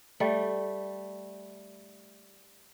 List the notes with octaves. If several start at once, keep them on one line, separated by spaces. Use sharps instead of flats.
G3 A3